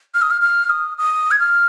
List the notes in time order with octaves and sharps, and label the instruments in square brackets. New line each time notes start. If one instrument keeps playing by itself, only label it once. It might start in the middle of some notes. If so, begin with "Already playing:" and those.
[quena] F6
D#6
F6
F6
D#6
D#6
G#6
F6